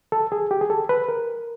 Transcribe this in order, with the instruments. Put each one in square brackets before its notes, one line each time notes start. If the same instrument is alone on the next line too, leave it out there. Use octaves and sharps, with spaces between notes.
[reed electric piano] A4
G#4
G4
G#4
A4
B4
A#4